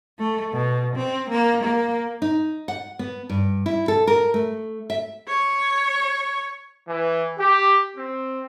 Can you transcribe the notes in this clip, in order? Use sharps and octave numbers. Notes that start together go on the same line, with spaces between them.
A3
B2
C4
A#3
A#3
D#4
F#5
B3
G2
E4
A4
A#4
A3
E5
C#5
E3
G4
C4